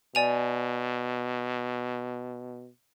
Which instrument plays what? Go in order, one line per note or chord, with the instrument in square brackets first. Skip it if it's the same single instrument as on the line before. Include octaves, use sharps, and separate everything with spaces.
[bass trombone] B2 [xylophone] D5 G#5 F7